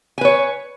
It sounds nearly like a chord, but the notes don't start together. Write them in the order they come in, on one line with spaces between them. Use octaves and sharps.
G#5 B4 C#5